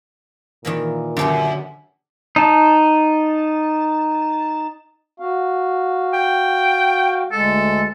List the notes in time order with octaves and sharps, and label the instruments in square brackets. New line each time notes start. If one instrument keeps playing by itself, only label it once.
[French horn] A#2 [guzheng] D#3 E3 A#3
[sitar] F#2 [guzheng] D3 D4 G4
[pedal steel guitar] D#4 A5
[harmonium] F#4 F5
[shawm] G5
[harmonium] D2 G#3 [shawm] A4